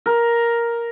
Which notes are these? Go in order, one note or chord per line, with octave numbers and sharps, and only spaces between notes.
A#4